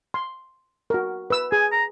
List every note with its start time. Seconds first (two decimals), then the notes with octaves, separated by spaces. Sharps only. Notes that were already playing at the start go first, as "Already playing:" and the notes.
0.14 C6
0.90 F#4 A#4
1.30 B4 E6
1.52 G#4 G#5
1.72 A#5